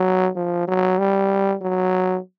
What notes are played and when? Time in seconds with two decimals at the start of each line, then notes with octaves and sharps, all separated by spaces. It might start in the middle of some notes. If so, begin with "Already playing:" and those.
Already playing: F#3
0.36 F3
0.68 F#3
0.99 G3
1.62 F#3